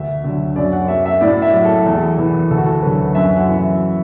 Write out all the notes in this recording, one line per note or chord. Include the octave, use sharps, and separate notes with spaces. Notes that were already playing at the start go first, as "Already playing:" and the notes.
Already playing: D2 E5
D3 F#3
F#2 D5
F#5
F#3 E5
E5
A2 D5
E5
F#3
A4
E2
E3
D2 A4
F#4
A4
D3 F#3 B4
F#2 E5
F#5
E3
E5